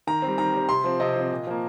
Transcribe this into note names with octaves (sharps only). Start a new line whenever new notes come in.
D#3 A#5
G3 C4
D#3 A#5
G3 C4
C3 C6
F3 C4
C3 D#5
F3 C4
A#2
F3 A#3